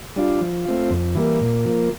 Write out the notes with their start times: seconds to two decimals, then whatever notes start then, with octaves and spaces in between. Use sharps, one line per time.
0.16 G3 D4 F4
0.41 F3
0.65 A3 C4 F4
0.90 F2
1.15 E3 G3 A#3
1.41 A#2
1.65 F3 A#3